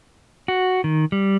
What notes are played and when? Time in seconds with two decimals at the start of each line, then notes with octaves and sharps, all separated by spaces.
0.48 F#4
0.84 D#3
1.12 G3